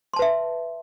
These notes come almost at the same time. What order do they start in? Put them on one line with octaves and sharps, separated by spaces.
C6 A5 B4 E5